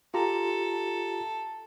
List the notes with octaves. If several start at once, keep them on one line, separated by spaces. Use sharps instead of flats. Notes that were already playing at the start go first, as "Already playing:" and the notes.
F4 G4 A4 A#5